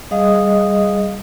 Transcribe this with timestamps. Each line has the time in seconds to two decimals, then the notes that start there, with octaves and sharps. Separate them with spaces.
0.11 G3 G#4 D#5 F5 D#6